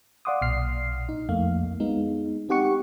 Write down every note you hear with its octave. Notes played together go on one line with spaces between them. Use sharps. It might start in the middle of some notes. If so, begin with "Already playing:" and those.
D5 F5 F#5 C6 D6 D#6
B1 A#2 F6 C7
D#4
F2 A3 A#3 F5
G#3 B3 D#4
C4 D#4 G4 F#5 C#6 C#7